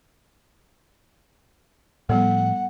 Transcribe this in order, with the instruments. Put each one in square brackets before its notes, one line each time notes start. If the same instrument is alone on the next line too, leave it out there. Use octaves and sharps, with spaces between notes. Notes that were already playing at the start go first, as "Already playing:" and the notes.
[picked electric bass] A2 F3 [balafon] G3 B3 A4 [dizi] F#5